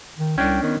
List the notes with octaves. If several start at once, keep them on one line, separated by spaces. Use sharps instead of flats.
D#3
C2 C#4 D4 G5
D#3 B3